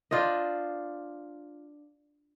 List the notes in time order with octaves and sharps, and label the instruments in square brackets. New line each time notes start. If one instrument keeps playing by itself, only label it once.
[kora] D4 F4 C5 D#5